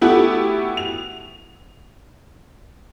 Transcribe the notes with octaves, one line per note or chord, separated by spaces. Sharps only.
A3 B3 E4 F#4 G4
F7